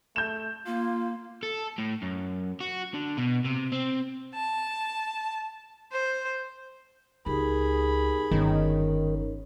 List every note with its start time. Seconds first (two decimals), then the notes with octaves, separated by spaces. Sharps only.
0.16 A3 G6 E7
0.66 A#3 F4
1.43 A4
1.78 A2
2.02 F#2
2.60 F#4
2.94 D3
3.17 B2
3.45 C3
3.72 C4
4.34 A5
5.92 C5
7.26 C#2 D#4 G4 G#4 A#4 B5
8.31 G1 D#3 C#4 D#4 C#5